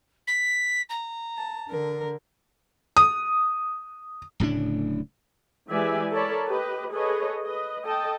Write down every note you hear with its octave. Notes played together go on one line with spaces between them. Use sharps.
B6
A#5
A5
D3 A#4
D#6
D1 A2 C#3 D4
E3 G#3 G4 D5 E5 G#5
A4 A#4 C#5 D5 A5 B5
G4 B4 D#5
G#4 A4 B4 C#5 D#5
B4 D#5
A4 D#5 G5 A5